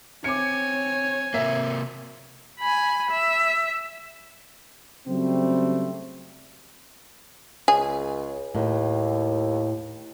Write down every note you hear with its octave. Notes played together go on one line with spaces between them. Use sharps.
C4 C#5 G#5 D6 C#7
C3 A#3 E5
G#5 B5
E5
C#3 F#3 G3 A3 C4
C#2 G#4
D#2 A2